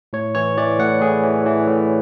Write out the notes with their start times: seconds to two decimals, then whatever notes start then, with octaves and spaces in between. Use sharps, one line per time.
0.13 A2 C#5
0.35 E3 C#5
0.57 E3 D5
0.79 A2 F#5
1.01 A2 G#4
1.24 E3
1.46 E3
1.67 A2